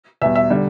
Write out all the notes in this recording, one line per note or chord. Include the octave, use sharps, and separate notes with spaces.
E2 B2 G3 E5
E5
D3 G3